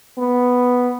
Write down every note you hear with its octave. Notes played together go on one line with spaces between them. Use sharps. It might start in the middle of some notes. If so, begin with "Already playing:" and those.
B3